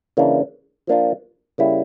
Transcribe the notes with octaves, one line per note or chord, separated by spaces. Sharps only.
C#3 E3 A#3 D4
F3 A#3 D4 F4
C#3 G3 A#3 E4